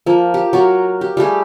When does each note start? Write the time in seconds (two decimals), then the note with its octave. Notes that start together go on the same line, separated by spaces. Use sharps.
0.06 F3 A#3
0.34 G4
0.53 F#3 F#4 A#4
1.01 G4
1.17 G3 A3 G4 G#4